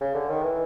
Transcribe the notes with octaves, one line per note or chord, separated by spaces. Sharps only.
C#3
D3
D#3
E3